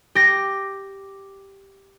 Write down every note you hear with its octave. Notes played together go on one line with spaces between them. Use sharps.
G4 A#6